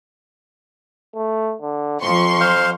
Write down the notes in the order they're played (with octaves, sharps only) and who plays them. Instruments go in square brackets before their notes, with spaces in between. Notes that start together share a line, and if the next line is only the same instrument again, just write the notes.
[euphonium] A3
D3
[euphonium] F2 [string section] F3 C6 C#6
[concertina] C5 F5